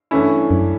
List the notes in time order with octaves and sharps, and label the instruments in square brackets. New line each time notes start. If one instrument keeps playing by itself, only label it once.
[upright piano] G2 E3 A3 C#4 E4
[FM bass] F#2